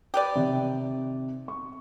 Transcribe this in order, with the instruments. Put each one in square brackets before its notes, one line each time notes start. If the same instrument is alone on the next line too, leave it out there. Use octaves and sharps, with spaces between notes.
[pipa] G4 B4 D5
[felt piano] C3 D#3
C#6